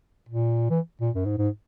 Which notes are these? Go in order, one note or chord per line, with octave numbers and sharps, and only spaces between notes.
A#2
E3
A#2
F#2
G#2
G#2